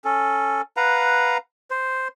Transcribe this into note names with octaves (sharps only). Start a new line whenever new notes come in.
C#4 A4
B4 F5 F#5 A#5
C5